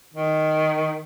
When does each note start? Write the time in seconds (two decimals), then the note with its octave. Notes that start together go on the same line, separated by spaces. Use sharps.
0.14 D#3